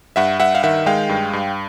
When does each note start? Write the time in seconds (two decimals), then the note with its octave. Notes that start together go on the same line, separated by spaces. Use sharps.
0.16 G2 E5 F#5
0.40 G2 E5 F#5
0.55 F5
0.63 D#3 E5 F#5
0.86 G#3 F5 G5
1.09 G2
1.33 G2